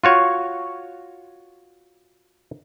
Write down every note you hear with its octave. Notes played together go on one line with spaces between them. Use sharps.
F4 F#4 C#5